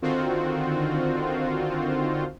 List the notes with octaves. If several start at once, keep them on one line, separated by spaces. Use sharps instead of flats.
D3 D#3 C4 F4 F#4 C5